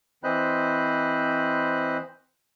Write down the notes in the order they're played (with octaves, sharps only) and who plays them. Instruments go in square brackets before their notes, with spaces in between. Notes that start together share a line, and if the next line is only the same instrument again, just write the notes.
[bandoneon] E3 C4 C5 D#5 B5 F#6